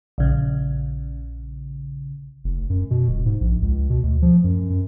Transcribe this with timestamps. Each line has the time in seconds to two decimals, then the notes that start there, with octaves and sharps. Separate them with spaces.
0.18 A#1 C#3
2.44 F1
2.70 F#2
2.90 B2
3.08 D#1
3.25 G#2
3.41 A#1
3.62 C#2
3.90 B2
4.03 D2
4.22 F3
4.44 F#2
4.70 F#2